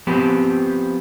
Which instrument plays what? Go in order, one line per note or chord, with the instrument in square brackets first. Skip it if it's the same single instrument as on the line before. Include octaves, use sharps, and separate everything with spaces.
[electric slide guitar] F3 B3 C4 G4